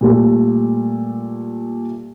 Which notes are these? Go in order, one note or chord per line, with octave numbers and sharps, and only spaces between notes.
A#2 G3 A3